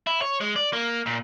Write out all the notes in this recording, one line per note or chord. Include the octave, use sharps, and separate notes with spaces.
E4
C#5
G#3
D5
A#3
A#2